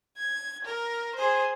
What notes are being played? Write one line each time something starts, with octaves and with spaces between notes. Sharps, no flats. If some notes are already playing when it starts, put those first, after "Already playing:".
G#6
A#4
G#4 C5